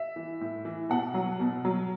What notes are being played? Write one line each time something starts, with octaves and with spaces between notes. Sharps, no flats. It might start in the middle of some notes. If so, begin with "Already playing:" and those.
Already playing: E5
E3
A2
E3
B2 F#5
F#3
B2
F#3